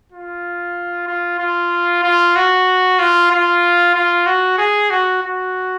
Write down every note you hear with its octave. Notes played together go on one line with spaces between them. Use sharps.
F4
F4
F4
F4
F#4
F4
F4
F4
F#4
G#4
F#4
F#4